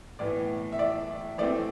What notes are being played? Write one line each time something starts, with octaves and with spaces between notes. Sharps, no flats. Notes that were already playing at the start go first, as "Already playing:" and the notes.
A2 E3 B3 D5
E5
D5
E3 A3 C4 D5